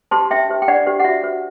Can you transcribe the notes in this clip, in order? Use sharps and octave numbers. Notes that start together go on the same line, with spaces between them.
G4 C5 A5 C6
D4 E5 G5
G4 C5
G5
D4 D5 F#5
G4 C5
F#5
F#4 E5
C5